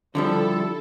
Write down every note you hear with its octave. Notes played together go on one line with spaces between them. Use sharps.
D3 F3 G3 E4 A4